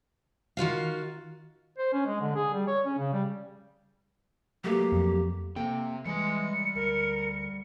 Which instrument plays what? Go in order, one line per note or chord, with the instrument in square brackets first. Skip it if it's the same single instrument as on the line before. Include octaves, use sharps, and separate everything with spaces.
[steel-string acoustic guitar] D#3 F4 F#4 F5
[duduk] C5
C#4
G#3
D3
G#4
G3
C#5
C#4
C#3
G3
[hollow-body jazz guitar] F#3 A3 A#3 [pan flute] G4
[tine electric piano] F2
[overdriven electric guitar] C3 [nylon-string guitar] A#3 A4 G5
[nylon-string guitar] E3 [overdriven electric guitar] G3 C6 [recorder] G#3 [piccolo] C#7
[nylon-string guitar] D2 [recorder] A#4